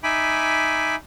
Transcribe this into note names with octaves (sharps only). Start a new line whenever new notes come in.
D#4 E5 G#5 B5 D6